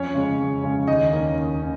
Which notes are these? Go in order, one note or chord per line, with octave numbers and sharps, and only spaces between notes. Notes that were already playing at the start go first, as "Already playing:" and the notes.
Already playing: F2 C#4 C#5
C#3 G#3 C#4
F2
C#3 G#3 C#4
D#2 D#4 D#5
D#3 A#3 C#4
D#2
C#4